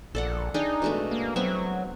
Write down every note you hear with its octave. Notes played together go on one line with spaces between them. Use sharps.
A#1 A4 D5 F#5
D4 D#4 G#4 G5
B2 G#3 A3
A#3
F#3 B3 C4 E5